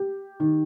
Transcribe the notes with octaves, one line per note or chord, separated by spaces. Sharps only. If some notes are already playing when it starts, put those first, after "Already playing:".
Already playing: G4
D#3